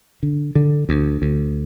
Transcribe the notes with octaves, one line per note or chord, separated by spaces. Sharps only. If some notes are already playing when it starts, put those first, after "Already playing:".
D3
D3
D2
D2